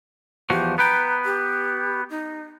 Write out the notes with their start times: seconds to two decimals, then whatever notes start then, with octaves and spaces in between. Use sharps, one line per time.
0.50 E2 F3 F#4 G4
0.78 B3 B4 G5 A#5
1.25 G4
2.10 D#4